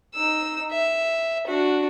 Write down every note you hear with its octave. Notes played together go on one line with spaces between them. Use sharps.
D#4 E6
E5
D4 F#4